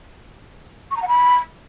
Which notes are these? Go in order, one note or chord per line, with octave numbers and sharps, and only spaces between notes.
C#6
A#5
F#5
B5